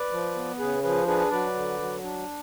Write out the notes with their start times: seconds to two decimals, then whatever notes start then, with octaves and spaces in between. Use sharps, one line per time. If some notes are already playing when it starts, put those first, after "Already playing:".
Already playing: B4 D5
0.11 F3
0.36 B3
0.59 C#3 G#4 B4
0.83 F3 G#4 B4
1.07 D4 G#4 B4
1.31 F#3 B4 D5
1.55 D3
1.79 F#3
2.03 D4